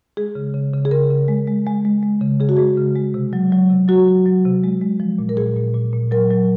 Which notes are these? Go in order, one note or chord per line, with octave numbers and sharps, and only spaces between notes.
G#3 G#4
C#3
C#3
C#3
G#4
C#3 A#4
C#3
G#3
G#3
G#3
G#3
G#3
C#3
C#3 G#4
F#4
G#3 G#4
C#3
G#3
C3
F#3
F#3
C3
F#3 F#4
F#3
F#3
C3
G#3
G#3
F3
A#2
A#4
A#2 G#4
A#2
A#2
A#2
F#3 A#4
F#3